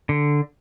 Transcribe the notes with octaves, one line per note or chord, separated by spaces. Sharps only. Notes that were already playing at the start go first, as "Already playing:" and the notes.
D3